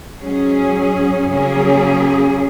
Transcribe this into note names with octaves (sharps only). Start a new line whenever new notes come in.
G#2 F#3 C#4 G#4
C#3 F#3 A#3 C#4 G#4